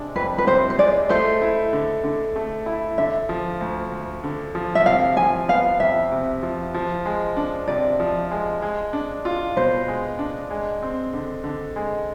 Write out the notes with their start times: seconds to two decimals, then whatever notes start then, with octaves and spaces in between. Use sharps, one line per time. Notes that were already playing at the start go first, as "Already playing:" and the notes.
Already playing: C3 G#3 D4
0.16 F2 B4
0.38 B4
0.47 C3 C5
0.70 C5
0.78 G#3 D5
1.09 A3 C5
1.41 E4
1.73 D3
2.04 D3
2.36 A3
2.66 E4
2.98 D3 E5
3.29 F3
3.61 D2
3.92 D2
4.23 D3
4.55 F3
4.75 E5
4.86 C3 F5
5.17 F3 G#5
5.48 B3 F5
5.80 F2 E5
6.12 C3
6.43 F3
6.74 F3
7.05 G#3
7.36 D4
7.68 C3 D5
8.00 F3
8.31 G#3
8.62 G#3
8.93 D4
9.25 F4
9.56 B2 C5
9.88 G#3
10.19 D4
10.50 G#3
10.82 C4
11.13 D3
11.44 D3
11.76 G#3